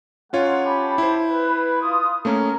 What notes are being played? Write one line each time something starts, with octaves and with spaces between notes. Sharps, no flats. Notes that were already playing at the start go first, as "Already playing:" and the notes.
G#3 A#3 C#4 F4 C#5 F#5
G4 A5 B5
E4 C5
B4
F4 D#6
A3 A#3 C#4 A#4